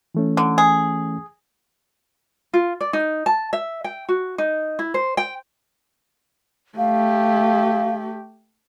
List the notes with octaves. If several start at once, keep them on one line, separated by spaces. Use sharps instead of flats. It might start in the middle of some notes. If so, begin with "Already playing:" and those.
E3 A3 C#4
D3
G#4
F4
D5
D#4
A5
E5
G5
F#4
D#4
E4
C5
G5
A3 G4 F5